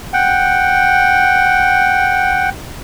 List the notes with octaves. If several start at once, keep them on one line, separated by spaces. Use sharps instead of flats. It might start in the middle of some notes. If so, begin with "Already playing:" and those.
F#5 G5